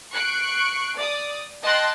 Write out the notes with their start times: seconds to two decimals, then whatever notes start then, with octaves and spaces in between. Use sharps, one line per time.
0.12 C#6 F#6 C7 D7
0.96 D5 D#6
1.62 D#5 G5 A5 C6 F#6